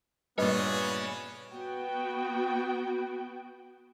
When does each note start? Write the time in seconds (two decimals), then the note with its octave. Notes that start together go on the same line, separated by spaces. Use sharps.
0.38 G2 A#2 B3 G#4 B4 C#5 D#5
1.53 B3 F#4 G5